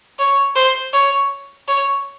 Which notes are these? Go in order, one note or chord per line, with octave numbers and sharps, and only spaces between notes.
C#5
C5
C#5
C#5